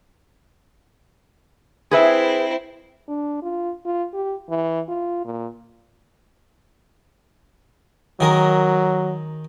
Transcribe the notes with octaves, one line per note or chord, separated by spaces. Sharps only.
C4 E4 G#4 B4 E5
D4
F4
F4
G4
E3
F4
A#2
D#3 F#3 G#4 A#4